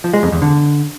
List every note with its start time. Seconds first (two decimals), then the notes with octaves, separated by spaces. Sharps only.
0.04 F3
0.14 G#3
0.23 F2
0.32 E2
0.42 D3